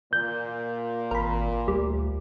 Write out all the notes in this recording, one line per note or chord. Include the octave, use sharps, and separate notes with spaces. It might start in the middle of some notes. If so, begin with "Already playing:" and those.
A#2 G6
G#1 A#4 B5
D2 G3